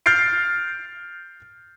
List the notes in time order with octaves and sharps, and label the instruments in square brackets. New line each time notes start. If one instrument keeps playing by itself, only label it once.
[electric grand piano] F6 G6 A6 C7 D7